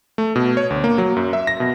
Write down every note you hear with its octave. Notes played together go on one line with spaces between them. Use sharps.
A3
B2
C#5
D2
A#3
F#3
F#2
E5
A#6
B2